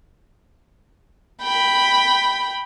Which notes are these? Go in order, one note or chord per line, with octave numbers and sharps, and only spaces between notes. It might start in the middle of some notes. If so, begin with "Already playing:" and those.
G5 B5